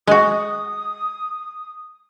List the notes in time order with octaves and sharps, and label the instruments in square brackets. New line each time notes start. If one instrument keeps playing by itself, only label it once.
[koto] G#3 F#4 [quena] D#6